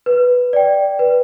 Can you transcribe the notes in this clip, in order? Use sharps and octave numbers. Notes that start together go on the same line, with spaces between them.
B4
D5 G5
B4